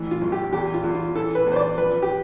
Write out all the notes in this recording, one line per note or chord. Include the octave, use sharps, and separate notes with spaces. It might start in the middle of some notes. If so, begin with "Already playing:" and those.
Already playing: A1 E3
F4
B1
G4
E2 G4
F4
E2
F4
E3 A4
B4
E2
C5
D5
F3 B4
G4